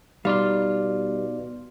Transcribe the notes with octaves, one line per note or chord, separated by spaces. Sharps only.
B2 G3 D#4 D5 F5 C6 F6